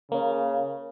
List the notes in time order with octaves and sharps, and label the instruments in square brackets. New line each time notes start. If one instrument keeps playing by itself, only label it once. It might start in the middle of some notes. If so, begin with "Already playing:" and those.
[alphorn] C#3 [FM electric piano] A#3 C#4